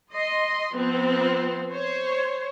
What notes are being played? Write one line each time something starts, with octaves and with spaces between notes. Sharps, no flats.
D#5 C6
F3 B3 C4
C5 C#5